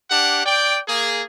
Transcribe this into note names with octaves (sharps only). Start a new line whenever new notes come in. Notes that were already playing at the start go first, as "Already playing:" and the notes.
D4 G4 F#5
D5 G5
A#3 G#4